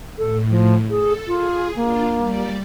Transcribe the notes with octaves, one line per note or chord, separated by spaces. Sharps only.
A2 A4
F3
G#4 A4
F4 G#4
A#3 D4 F4
G3 D5